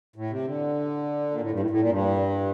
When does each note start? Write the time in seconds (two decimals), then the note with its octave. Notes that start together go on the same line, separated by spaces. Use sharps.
0.16 A2
0.30 C3
0.44 D3
1.31 A#2
1.40 A2
1.51 G2
1.60 A2
1.70 A2
1.80 A#2
1.89 G2